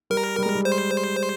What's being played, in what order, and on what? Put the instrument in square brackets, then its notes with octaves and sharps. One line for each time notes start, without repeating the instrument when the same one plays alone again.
[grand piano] G3 [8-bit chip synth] A#4
[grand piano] G3
G#3
G3
[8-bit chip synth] C5